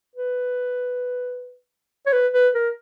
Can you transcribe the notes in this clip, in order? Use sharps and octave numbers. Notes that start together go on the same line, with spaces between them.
B4
C#5
B4
B4
A#4